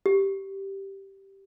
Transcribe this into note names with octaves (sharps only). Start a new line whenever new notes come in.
G4